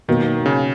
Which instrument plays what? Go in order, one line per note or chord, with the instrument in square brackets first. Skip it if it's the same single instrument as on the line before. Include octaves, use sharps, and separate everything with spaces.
[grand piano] B2 F#3 A#3 D#4 [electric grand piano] D#3
[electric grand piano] C#3